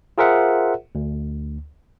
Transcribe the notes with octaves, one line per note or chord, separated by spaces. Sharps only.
F4 G#4 A#4 C5 E5 F#5
D2